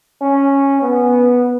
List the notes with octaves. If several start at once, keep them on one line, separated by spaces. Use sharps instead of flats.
C#4
B3